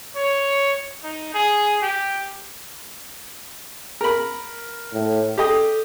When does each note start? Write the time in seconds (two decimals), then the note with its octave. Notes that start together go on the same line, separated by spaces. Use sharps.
0.16 C#5
1.03 D#4
1.34 G#4
1.82 G4
4.01 A#4 B5
4.94 A2
5.38 G4 A4 D#5